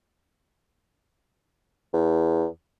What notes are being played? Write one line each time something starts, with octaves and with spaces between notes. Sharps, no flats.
E2